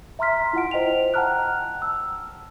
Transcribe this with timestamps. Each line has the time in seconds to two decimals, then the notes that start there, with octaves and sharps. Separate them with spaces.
0.19 E5 A#5 C6 F6 B6
0.53 E4 F4 F#5 D7
0.71 C5 D#5 G5 F7
1.14 F#5 G5 A5 A#5 F6 F#6
1.82 E6